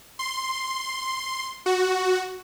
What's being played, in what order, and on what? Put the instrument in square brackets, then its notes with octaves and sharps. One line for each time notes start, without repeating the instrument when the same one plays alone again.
[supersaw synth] C6
F#4